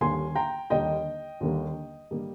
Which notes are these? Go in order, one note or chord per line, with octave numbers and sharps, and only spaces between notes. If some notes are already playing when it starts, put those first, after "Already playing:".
D#2 D3 G3 A#3 G#5 C6
G5 A#5
D#2 D3 G3 A#3 D#5 G5
D#2 D3 G3 A#3
D3 G3 A#3